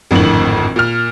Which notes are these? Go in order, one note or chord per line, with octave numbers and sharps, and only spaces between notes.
G#1 F2 A2 D3 F#7
A#2 F6